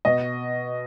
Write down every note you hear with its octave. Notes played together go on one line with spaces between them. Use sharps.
B2 D#5